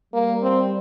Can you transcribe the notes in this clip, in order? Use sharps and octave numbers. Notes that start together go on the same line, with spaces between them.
G3 A#3
C4